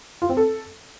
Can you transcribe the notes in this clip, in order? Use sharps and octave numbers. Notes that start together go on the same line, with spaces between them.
F4
C4
A4